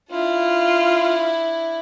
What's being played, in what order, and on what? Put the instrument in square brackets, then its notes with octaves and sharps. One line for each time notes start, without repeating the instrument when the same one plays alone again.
[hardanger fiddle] D4 E4 [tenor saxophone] F4